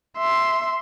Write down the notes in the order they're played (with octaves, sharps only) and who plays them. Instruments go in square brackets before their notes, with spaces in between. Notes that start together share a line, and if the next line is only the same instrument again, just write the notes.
[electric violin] E5 C6